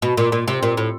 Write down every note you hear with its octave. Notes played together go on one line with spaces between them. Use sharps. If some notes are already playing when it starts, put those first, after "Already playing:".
B2
A#2
A#2
C3
A#2
A2